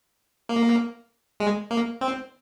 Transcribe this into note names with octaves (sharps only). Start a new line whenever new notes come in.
A#3
G#3
A#3
C4